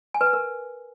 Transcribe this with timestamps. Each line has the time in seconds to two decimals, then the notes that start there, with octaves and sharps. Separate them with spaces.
0.14 G#5
0.21 B4
0.27 G#5
0.33 A#4